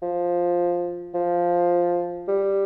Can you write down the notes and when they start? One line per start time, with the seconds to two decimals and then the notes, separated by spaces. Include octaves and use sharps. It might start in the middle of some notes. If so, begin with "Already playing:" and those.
0.02 F3
1.15 F3
2.28 G3